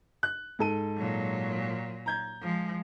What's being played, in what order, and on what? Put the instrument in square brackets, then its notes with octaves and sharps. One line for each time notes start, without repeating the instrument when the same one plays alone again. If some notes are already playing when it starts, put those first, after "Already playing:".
[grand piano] F#6
G#2 A4 D#7
[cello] A#2 F#3
[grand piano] A#5 G6 G#6
[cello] F3 G#3